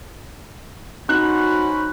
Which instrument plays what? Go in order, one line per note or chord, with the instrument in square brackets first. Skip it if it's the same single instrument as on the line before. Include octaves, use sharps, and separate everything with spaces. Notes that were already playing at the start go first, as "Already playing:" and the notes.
[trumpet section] C#4 C5 B5 [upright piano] D#4 F#6 [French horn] F#4